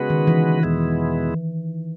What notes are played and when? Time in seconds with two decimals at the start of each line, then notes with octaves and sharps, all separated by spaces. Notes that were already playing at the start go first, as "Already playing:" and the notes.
Already playing: C#3 G#3 B3 F#4 B4
0.10 D#3
0.27 E3
0.63 E2 B2 G#3 B3 E4